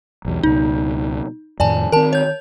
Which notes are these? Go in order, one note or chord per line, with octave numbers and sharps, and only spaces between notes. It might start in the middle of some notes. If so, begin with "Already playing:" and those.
B1 E2
C#2 B2 D#4
F2 A2 D#3 D5 G#5 A5
D#3 C4 A#4 A5
C#5 G6